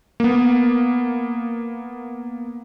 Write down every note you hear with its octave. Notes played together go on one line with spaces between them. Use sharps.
A#3 B3